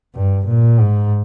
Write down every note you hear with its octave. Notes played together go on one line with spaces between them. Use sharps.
G2
A#2
G#2